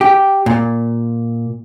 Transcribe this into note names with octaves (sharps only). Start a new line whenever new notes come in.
G4
A#2